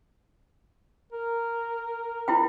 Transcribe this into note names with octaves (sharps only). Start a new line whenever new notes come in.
A#4
E4 F4 G5